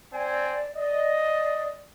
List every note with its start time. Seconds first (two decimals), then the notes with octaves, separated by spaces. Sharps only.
0.12 C4 D5 G#5
0.77 D5 D#5